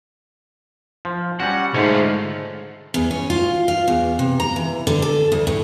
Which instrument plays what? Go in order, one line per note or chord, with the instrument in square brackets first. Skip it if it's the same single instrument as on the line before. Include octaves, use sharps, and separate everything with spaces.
[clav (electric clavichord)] F3
[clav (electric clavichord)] G3 C#4 F#4 [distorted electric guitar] F#5
[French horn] G#2 [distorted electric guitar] D3 F4 [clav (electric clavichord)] A3 C#5
[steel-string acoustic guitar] E2
C#4
F4
F5
E2
C3
A#5
E3
D3
A4
D2
A2